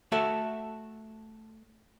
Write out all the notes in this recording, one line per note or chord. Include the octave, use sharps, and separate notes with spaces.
A3 F#4 A4 E5